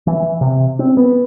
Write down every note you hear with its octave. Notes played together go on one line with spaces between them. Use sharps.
E3
C3
C4
B3